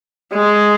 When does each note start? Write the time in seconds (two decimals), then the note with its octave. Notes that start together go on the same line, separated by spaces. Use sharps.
0.33 G#3